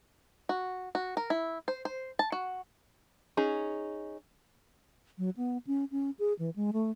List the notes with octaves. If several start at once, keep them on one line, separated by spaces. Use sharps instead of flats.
F#4
F#4
A#4
E4
C5
C5
A5
F#4
C#4 D#4 G#4
F#3
B3
C#4
C#4
G#4
E3
G#3
A3